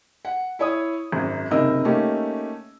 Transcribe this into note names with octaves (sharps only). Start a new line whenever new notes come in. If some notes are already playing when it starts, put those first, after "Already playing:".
F#5
E4 C#5 D#6
G#1 F#2
F#1 C3 D#3 A#4 D#5 E6
A3 A#3 C#4 D#4 G4